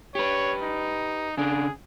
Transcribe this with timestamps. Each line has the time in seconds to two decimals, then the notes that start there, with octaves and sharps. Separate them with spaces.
0.15 G4 B4 C#5
0.63 D#4
1.37 C#3 D4 G#4